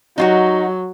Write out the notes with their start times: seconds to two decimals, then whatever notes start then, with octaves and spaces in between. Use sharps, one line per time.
0.18 F#3 D#4 F4 F#4